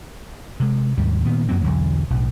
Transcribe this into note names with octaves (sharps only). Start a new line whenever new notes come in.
C3 G#3
D#2 G#2 G3
A#2 D#3 B3
F#2 F#3 A#3 C4
B1 E2 D3 F#3
B1 A2